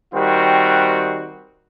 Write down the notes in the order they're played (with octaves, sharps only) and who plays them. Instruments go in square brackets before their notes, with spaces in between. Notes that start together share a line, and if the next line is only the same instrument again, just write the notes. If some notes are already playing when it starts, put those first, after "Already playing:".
[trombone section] D#3 G3 C4 F#4